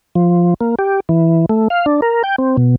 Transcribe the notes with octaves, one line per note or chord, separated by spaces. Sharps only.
F3
A#3
G4
E3
A3
F5
D4
A#4
G5
C4
B2